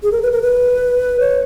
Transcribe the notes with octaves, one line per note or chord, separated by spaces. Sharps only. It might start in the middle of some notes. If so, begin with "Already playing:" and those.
G#4
A#4
B4
A#4
B4
C#5